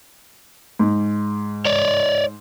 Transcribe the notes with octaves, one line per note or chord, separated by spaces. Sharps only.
G#2
C#5 D5